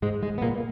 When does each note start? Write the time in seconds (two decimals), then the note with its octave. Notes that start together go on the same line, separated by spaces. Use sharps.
0.02 G#2 G#3
0.22 G#2 G#3
0.38 B3
0.42 A#2 A#3